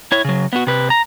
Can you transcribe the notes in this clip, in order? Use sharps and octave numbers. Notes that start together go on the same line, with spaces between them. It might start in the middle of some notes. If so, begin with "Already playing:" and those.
E4 C#5
C#3 F#3
B3 F#4
C3 B4
A#5